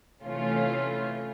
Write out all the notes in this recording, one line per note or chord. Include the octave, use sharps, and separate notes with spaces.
C3 E3 A3 C#4 F4